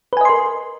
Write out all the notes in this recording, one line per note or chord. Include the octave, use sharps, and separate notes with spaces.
A#4 B4 D#5 G#5 C6